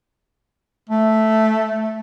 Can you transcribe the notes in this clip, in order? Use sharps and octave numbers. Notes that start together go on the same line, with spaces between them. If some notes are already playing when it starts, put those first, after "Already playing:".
A3